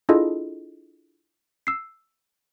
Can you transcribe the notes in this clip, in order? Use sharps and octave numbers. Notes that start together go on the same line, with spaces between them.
D4 E4 F4 G#4 A4 D#5
E6 C7